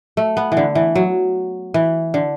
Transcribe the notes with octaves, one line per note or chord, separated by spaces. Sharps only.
A3
B3
E3
D3
E3
F#3
E3
D3